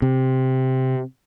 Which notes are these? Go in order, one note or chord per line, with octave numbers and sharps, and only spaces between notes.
C3